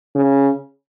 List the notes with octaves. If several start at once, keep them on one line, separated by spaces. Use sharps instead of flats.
C#3